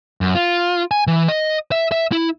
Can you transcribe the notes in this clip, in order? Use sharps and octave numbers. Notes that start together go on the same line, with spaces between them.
F#2
F4
G#5
E3
D#5
E5
E5
E4